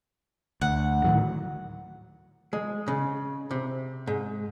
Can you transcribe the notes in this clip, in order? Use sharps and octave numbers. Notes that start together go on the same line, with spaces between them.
D2 F#5
A2 D#3 F#3
G#3
C#3
C3
G#2